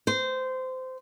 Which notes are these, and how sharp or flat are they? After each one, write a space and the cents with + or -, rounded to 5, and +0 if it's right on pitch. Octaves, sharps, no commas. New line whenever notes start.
C5 -20